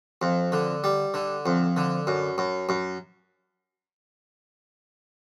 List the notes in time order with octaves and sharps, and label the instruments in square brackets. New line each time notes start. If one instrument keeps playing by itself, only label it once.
[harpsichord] F2
D3
G3
D3
F2
D3
F#2
F#2
F#2